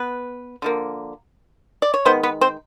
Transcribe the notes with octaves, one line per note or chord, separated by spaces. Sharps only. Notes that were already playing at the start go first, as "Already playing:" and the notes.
Already playing: B3 B4
D3 F3 A#3
D5
C#5
D#3 G#3 B3 C5
B3 B4
C4 C5